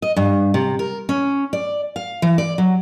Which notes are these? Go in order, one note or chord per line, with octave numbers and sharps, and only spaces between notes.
D#5
G2
C3
A#4
C#4
D5
F5
E3
D5
F#3